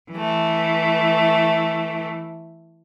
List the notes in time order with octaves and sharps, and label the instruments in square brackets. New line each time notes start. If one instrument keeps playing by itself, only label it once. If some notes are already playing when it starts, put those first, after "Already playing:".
[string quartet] E3 A3